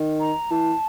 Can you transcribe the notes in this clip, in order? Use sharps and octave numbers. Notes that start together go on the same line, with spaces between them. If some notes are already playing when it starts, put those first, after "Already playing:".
Already playing: D#3
A#5
E3 A5